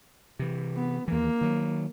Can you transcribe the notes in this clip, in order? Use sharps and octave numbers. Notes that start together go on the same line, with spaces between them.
C3 E3
B3
D#2 E3 A#3
D#3 F#3